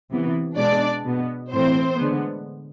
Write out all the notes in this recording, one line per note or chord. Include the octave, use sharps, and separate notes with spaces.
C3 E3 B3
B2 G#3 B3 D4 D5
B2 B3
A2 E3 A3 C4 C5
D3 G#3 B3